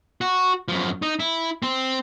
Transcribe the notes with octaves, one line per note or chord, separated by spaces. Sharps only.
F#4
F#2 F3
D#4
E4
C4